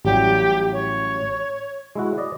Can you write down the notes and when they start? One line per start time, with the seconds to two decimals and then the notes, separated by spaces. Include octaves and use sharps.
0.05 A1 F#3 G3 G4
0.73 C#5
1.95 G#3 E4 F#4
2.18 D5 D#5